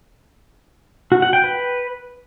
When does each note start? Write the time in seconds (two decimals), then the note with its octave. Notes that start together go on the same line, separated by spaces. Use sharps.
1.12 F#4
1.22 F#5
1.33 G5
1.44 B4